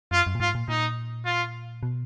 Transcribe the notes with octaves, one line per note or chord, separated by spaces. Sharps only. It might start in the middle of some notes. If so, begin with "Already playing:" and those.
F#2 F4
F#2
A#2
G#2 F4
A#2
A#2 D#4
F4
B2